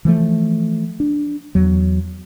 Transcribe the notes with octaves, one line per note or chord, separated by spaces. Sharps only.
E3 F3 A3
D4
E2 F#3